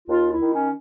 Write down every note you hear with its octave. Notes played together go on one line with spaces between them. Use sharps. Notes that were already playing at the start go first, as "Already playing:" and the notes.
D#2 F4
E4
D#3
C#4